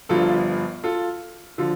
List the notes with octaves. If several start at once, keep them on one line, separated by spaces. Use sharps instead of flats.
G1 G2 F3 F4 A4
F4 A4
D3 F3 F4 A4